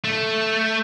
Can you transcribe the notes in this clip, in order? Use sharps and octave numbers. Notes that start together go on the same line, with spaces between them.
A3